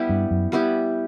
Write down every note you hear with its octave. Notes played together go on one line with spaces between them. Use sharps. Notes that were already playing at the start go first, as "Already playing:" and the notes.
Already playing: G3 B3 E4 G4
G2
F#2
G3 B3 E4 G4